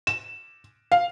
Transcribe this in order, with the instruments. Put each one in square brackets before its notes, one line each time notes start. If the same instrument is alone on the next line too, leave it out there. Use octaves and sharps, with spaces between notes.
[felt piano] E7
F5